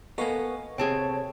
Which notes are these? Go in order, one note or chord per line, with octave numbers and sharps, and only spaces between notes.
A#3 B3 A4 D#5 F5 G#5 C#6
C3 C4 G#4 C#5 G5 A5